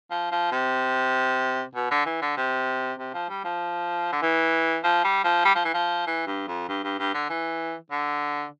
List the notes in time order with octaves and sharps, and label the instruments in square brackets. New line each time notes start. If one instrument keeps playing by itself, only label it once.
[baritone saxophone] F3
F3
C3
B2
D3
E3
D3
C3
C3
F3
G3
F3
D3
E3
F3
G3
F3
G3
F3
E3
F3
E3
G2
F2
G2
G2
G2
D3
E3
D3